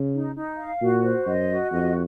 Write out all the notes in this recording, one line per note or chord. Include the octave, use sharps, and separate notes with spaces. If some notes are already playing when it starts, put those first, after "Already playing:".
Already playing: C#3
D#4
D#4
F5
A#2 F#4
C5
F#2 D#5
F#4
F2 D#5